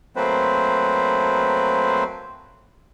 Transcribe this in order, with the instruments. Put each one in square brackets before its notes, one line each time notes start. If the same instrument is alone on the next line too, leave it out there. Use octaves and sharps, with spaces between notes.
[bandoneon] F#3 A3 A#3 C4 B4 C5